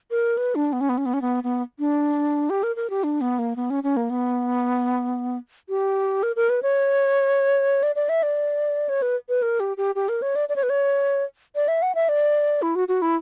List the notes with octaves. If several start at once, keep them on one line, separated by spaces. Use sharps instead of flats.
A#4
B4
D4
B3
C#4
B3
C#4
B3
C#4
B3
B3
D4
G4
A#4
A#4
G4
D4
B3
A#3
B3
C#4
C#4
A#3
B3
G4
A#4
A#4
B4
C#5
D5
D5
E5
D5
C#5
B4
B4
A#4
G4
G4
G4
A#4
C#5
D5
D5
C#5
B4
C#5
D5
E5
F#5
E5
D5
E4
F#4
F#4
E4